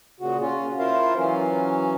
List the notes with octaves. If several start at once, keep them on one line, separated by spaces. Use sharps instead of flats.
A#2 C#3 F#4
C#4 F4
E4 F4 A#4 C5 E5 F5
E3 F#3 C#4